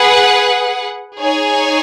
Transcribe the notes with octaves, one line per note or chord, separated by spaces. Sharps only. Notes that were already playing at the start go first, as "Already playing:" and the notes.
Already playing: G#4 B4 F#5
D#4 G#4 C#5 G#5